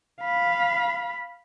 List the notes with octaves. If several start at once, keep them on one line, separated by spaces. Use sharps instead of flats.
F5 B5